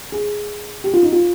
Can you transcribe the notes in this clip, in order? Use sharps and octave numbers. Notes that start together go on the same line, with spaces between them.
G#4
G4
F4
D#4
F4